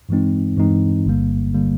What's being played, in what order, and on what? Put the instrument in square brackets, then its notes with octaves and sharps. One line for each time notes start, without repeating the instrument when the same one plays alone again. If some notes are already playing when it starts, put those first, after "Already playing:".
[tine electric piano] G2 E3 G#3 C4 D#4
G2 E3 G#3 C4 D#4
G1 G2 D3 G3 A#3
D3 G3 A#3